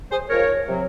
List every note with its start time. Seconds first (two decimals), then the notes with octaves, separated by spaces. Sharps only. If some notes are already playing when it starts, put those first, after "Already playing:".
0.11 G#4 C5
0.30 G#2 F3 A#4 C#5
0.69 C3 F#3